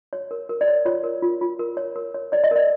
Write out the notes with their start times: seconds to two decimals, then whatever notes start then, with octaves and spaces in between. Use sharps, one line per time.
0.13 C#5
0.31 A#4
0.49 A#4
0.61 D5
0.68 C#5
0.85 F4 C#5
1.04 A#4
1.22 F4
1.41 F4
1.59 A#4
1.77 C#5
1.96 A#4
2.14 C#5
2.32 C#5 D5
2.44 D#5
2.51 A#4 D5